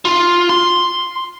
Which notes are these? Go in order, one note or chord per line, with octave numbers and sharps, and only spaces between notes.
F4
C6